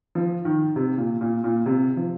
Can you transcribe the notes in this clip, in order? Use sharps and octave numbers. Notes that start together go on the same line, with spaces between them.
F3
D#3
C3
A#2
A#2
A#2
C3
F3